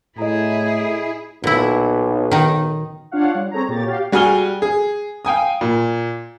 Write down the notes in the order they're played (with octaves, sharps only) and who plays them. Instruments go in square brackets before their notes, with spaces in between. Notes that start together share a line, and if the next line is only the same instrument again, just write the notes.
[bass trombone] A2 [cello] E4 G#4 [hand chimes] D#5 A#5
[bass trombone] B1 [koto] A#2 E4
[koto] D#3 D#4
[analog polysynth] D4 F4 C#5 F5 F#5
G3
C4 G#4 A4 C5 C#5 A#5
A#2 G4 C#5 A6
F#4 G4 F5
[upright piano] G3 F#4 G#4 G#5 F6 G7
G#4
F5 G5 G#5 D#6
A#2